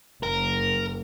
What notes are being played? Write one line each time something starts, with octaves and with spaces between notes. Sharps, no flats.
F#1 A#4